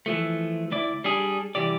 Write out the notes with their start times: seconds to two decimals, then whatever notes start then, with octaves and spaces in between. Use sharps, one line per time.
0.06 E3 F3 A3
0.71 D2 E4 D5
1.04 G3 D4 G#4
1.55 C2 E3 G4 D5